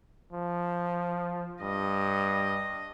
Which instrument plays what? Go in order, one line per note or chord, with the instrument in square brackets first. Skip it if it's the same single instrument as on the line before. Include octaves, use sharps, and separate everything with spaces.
[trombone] F3
[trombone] G2 [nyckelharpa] D#5